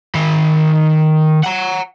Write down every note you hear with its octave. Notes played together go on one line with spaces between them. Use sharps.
D#3 B5
F#5 A#5